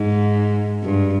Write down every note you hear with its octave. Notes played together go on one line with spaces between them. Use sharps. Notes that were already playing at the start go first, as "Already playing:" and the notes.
Already playing: G#2
G2